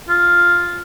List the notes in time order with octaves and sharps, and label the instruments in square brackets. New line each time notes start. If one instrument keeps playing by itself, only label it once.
[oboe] F4